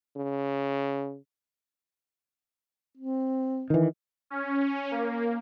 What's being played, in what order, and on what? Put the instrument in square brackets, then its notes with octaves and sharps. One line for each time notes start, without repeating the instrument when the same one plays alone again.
[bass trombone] C#3
[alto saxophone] C4
[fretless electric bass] D#3 E3
[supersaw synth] C#4
A#3